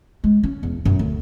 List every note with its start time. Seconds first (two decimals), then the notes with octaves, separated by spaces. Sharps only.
0.24 G#3
0.43 C#4
0.63 E2
0.85 F#2
0.99 D2